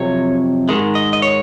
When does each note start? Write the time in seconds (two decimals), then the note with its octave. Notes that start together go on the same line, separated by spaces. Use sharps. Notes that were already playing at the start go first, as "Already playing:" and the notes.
Already playing: F2 C3 F#3 C#5
0.69 G#2 D#3 G#3
0.95 D#5
1.13 D#5
1.22 C#5